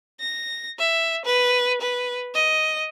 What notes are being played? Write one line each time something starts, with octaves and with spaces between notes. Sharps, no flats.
A#6
E5
B4
B4
D#5